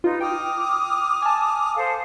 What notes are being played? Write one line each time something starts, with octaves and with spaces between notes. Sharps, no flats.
D#4 F4 B4
G5 D6 D#6 F6
G#5 A5
A4 C5 F5